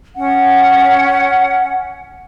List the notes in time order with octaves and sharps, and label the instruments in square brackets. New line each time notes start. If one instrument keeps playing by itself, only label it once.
[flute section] C#4 F#5